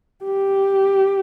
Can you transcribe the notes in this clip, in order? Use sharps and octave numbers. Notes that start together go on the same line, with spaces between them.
G4